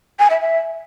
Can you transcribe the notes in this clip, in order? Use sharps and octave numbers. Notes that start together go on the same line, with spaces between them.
G#5
E5
E5